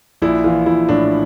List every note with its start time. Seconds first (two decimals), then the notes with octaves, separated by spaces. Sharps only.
0.22 A#1 E4
0.44 E3 F4
0.66 A#1 E4
0.89 A2 D4